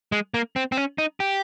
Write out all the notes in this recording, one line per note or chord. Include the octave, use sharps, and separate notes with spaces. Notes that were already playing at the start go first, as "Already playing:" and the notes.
G#3
A#3
C4
C4
C#4
D#4
G4